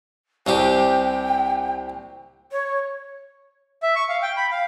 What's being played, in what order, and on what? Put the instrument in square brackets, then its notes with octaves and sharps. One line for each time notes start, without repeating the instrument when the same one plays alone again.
[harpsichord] C2 C3 G4 [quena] G5
[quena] C#5
[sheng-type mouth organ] E5
C#6
F5
G5
B5
F5